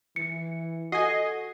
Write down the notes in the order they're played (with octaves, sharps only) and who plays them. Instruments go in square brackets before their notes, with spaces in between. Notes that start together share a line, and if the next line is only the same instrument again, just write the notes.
[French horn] E3 [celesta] C#7
[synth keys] F#4 [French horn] A4 [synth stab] D#5 G#5 [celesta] C7